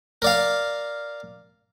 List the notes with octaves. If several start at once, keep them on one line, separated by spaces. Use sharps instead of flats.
A#4 D5 F5